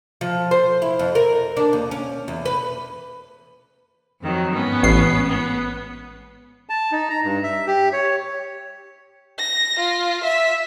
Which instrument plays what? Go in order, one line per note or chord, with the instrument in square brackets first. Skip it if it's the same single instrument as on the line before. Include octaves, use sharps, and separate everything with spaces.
[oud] F3
C5
E4
F2
A#4
D4
D#2
C#4
E2
B4
[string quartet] F2 D#3 F#3
G#2 B3 C#4
[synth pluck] A1 C7
[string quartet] B3
[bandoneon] A5
D#4
A#5
G2
E5
G4
C#5
[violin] A#6
F4
E5